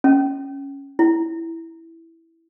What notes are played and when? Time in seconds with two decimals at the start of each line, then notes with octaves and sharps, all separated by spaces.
0.04 C#4
0.99 E4